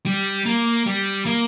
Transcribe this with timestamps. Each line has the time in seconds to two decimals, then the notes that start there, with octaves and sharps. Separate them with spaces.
0.06 G3
0.46 A#3
0.86 G3
1.26 A#3